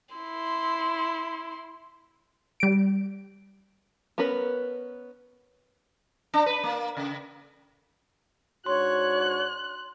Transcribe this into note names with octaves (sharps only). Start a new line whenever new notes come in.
E4 C6
G3 D7
B3 C#4 A#4 B4
D4
B4
A#3
C#3
G#2 D4 F#4 C#5 C6 F#6